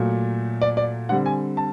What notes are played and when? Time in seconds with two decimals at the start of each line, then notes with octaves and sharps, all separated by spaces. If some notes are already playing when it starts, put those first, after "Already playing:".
Already playing: A#2 F#3 A3
0.62 D5
0.77 D5
1.09 D3 G3 C4 F#5
1.26 G#5
1.57 A5